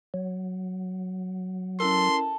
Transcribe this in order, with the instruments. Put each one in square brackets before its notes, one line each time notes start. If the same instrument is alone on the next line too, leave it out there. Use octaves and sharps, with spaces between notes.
[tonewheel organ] F#3
[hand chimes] C#4 E4 A#4 [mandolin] A4 [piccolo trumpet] C6